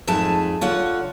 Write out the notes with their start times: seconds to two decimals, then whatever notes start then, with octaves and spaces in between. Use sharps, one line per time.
0.07 F2 G#2 A3 G#4 A5
0.61 D3 F4 C#5 F#5